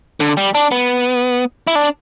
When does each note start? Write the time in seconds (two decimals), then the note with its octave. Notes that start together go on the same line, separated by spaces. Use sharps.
0.20 D3
0.37 G3
0.55 D4
0.72 B3
1.67 E4
1.75 D4